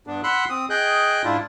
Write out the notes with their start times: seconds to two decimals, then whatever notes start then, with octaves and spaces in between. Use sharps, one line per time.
0.07 G2 B3 D4
0.24 F#5 B5 C6 E6 F#6
0.50 C4 D#6
0.70 G#4 D#5 G5 F#6 G6
1.24 G#2 D4 E4 F4